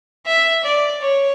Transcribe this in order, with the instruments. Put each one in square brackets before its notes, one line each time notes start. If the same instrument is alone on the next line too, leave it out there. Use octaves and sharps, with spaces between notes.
[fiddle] E5
D5
C#5